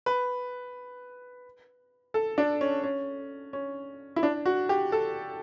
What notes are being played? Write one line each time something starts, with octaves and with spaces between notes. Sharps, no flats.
B4
A4
D4
C#4
C#4
C#4
E4
D4
F#4
G4
A4